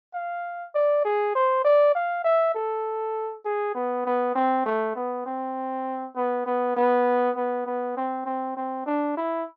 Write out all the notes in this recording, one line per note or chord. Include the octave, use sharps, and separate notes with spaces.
F5
D5
G#4
C5
D5
F5
E5
A4
G#4
B3
B3
C4
A3
B3
C4
B3
B3
B3
B3
B3
C4
C4
C4
D4
E4